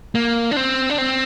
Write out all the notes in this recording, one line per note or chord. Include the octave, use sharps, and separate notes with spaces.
A#3
D4
C4
D4
C4